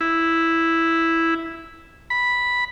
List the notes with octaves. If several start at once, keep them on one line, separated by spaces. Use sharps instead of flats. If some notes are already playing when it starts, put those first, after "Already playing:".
E4
B5